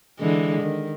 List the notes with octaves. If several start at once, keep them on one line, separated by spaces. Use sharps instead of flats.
D3 E3 G#3
D#3